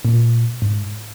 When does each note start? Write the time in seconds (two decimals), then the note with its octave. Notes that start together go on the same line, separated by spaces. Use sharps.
0.05 A#2
0.62 G#2